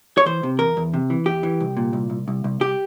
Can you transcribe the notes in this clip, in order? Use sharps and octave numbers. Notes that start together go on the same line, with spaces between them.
C#5
E3 C5
C3
E2 A#4
E2
C3
E3
E2 G4
E3
C2
A#2
C2
C2
C2
C2
C2 G4